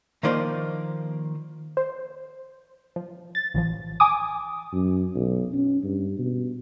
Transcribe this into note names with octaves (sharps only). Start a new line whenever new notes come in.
D#3 F3 A#3 D#4 C5 D5
C5
F3
A6
A1 E3 F3
G#5 D6 D#6
F#2
B1
C#4
G2
B2